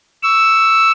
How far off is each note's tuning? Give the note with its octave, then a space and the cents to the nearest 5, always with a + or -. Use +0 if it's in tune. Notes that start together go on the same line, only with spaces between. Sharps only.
C#6 +20 E6 +0